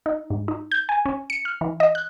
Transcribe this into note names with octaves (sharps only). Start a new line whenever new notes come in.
D#4
G#2
D#4
G6
G#5
C#4
C#7
F6
E3
D#5
F#6